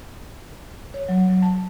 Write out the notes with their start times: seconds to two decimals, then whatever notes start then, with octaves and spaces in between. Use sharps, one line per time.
0.94 C#5
1.09 F#3
1.29 F#3
1.42 A5